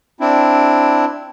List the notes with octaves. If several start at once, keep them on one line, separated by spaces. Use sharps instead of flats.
C4 D4 E4